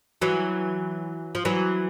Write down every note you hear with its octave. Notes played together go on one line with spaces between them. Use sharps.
E3 F#3
F3
E3 F#3